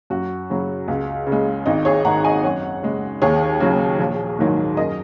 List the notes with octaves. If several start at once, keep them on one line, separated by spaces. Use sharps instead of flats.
F#2 F#4
C#3 F#3
C#2
C#3
G#3
G#1 D#4
G#4 C#5
G#2 D#3 F#5 A#5
D#5 G#5
F#2 C#5 F#5
C#3 G#3
D#2 G#4 C#5
C#3 F#3
A#1
G#2 D#3 F#3
F#2 A#4 D#5